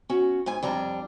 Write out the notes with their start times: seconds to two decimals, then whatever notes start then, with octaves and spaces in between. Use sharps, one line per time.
0.10 C#4 F#4
0.46 G#2 G#5
0.63 F2 G3 D4 A#5